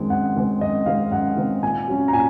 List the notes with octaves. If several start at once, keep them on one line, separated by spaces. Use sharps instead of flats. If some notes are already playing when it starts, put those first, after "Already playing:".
Already playing: F#2 D#3 G#3 C4
F#2 F#5
D#3 G#3 C4
F#2 D#5
D#3 G#3 C4 F5
F#2 F#5
D#3 G#3 C4
A#2 G#5
F#3 C#4
A#5
A#2 G#5